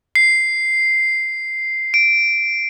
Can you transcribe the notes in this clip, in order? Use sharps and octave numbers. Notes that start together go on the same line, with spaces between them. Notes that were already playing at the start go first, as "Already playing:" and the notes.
C7
D7